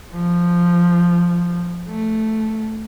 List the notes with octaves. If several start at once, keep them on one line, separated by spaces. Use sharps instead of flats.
F3
A3